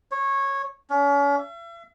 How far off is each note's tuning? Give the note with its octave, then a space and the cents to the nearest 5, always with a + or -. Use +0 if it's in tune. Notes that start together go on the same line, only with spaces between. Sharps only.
C#5 -15
C#4 +40
E5 +40